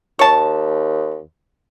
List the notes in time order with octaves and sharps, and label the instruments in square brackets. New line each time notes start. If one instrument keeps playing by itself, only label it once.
[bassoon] D#2 [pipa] C#5 A5